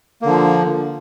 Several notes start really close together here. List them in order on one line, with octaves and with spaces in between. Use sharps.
A#3 D3 F3